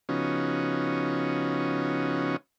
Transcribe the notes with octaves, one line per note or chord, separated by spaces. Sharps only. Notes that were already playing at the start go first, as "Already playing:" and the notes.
C#3 F3 B3 C#4 D#4 F#4